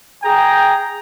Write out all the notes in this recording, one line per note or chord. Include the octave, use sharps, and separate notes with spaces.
G#4 G5 A#5